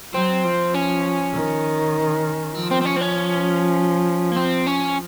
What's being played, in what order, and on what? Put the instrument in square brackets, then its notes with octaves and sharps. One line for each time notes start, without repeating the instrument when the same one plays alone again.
[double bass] F#3 [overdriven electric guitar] C4
[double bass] F3
[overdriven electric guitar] C#4
[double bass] D#3
[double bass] F3 [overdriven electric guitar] C4
[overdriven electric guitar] C4
C4
C#4
C4
C#4
A#3
C4
C#4